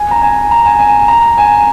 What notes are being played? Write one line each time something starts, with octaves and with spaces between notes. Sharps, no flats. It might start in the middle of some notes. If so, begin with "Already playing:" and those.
Already playing: G#5
A#5
G#5
A#5
G#5
G#5
A#5
G#5